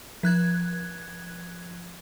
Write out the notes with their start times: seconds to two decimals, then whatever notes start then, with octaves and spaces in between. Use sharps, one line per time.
0.23 F3 F#6 G#6